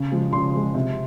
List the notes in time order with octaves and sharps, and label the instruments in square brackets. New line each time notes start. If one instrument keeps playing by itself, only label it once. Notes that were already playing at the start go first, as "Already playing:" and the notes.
Already playing: [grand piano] C#3
F3 G#3
C#3 C6
F3 G#3
C3